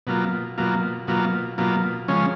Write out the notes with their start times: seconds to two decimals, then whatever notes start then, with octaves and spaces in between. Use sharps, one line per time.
0.07 B2 F#3 A#3 F4
0.58 B2 F#3 A#3 F4
1.08 B2 F#3 A#3 F4
1.58 B2 F#3 A#3 F4
2.08 C#3 F3 G#3 C#4